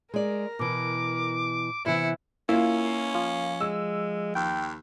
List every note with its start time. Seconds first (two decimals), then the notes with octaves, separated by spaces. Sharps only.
0.14 G#3 A#4 D5
0.59 B2 E3 D6
1.86 C3 E3 B3 E4 C#7
2.49 A#3 C#4 E4 F4
3.15 F3
3.61 G#3 E6
4.35 D#2 G5